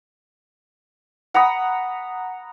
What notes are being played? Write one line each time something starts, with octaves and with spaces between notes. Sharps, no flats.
F#5 A#5 B5 D#6